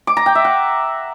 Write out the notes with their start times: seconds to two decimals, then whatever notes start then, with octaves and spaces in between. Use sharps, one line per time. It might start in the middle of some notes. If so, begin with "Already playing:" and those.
0.07 D6
0.17 A#5
0.26 G5
0.35 E5
0.45 F#5